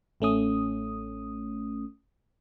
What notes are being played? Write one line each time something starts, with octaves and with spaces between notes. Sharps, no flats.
A1 A3 C#4 D#6